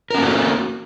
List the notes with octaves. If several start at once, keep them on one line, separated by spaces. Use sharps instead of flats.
A#3 C#4 F#4 A4 A#4